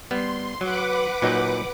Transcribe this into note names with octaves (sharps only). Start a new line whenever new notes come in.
G3 B3 C6
F#3 B4 F#5 D6
A#2 F#3 D#4